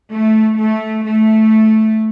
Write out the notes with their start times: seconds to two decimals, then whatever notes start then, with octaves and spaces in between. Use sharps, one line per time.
0.11 A3
0.59 A3
1.06 A3